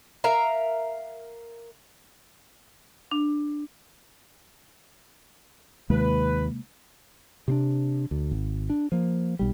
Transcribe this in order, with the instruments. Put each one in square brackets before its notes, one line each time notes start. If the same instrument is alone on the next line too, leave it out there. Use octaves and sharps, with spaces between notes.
[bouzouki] A#4 E5 F5 A#5
[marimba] D4
[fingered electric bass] D#2 [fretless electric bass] C3 G#3 A#3 [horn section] B4
[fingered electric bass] C3 C4 D4
D2
G#1
D4
F3 A#3
B1 G3